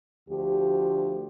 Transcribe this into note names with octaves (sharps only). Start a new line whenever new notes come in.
D2 F3 G4